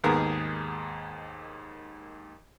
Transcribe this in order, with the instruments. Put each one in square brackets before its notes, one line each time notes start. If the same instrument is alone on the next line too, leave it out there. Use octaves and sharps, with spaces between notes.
[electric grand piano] D#2 G#2 D#3 [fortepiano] B3 G#4 A#4